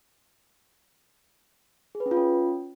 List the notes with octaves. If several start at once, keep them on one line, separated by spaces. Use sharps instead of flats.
G#4
B4
C#4
F4
C#4